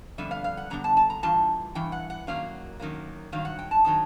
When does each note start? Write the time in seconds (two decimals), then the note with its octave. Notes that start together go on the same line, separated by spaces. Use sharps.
0.18 F2 D3 G3 B3 E5
0.31 F5
0.44 F5
0.57 F#5
0.70 F2 D3 G3 B3 A#5
0.84 A5
0.97 A5
1.10 A#5
1.23 G2 E3 F4 A5
1.75 G2 E3 G5
1.92 F#5
2.10 F#5
2.27 F#2 D#3 F#3 A#3 F5
2.80 F#2 D#3 F#3 A#3
3.32 G2 D#3 F#3 F5
3.45 F#5
3.59 G5
3.71 A5
3.85 D#3 F#3 A5